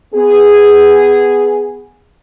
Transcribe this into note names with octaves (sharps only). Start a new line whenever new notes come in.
B3 G#4